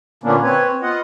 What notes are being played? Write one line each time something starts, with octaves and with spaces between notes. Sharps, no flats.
A#2 D3 A#3 B3 C#4 D4
C4 B4 C#5
B3 F4 D#5 F#5